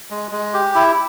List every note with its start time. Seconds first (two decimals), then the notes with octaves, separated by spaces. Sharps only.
0.10 G#3
0.31 G#3
0.54 G4
0.75 E4